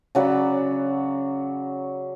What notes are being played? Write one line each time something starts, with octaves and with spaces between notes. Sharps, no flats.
C#3 F#3 D5 B5